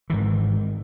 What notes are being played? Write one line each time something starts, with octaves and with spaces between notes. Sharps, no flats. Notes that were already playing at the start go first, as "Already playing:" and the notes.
G#2 D#3 E3